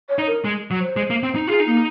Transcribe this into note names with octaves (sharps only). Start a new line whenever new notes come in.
C#5
D#4
A#4
G#3
F#3
C5
G#3
A#3
C4
D#4
F4 G#4
D#4
A#3